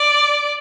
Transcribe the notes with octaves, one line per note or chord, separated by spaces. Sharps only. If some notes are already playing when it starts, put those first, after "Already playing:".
Already playing: D5